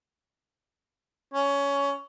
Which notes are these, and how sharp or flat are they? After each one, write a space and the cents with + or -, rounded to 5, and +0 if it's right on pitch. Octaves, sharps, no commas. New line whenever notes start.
C#4 +15